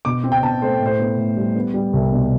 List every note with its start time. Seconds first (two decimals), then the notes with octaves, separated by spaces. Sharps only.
0.05 B2 D6
0.24 C4
0.32 G5
0.43 B2 A5
0.62 A3 C5
0.80 A2
0.86 C5
0.99 B3
1.18 A2
1.37 G3
1.56 B3
1.74 G3
1.93 C2
2.12 B2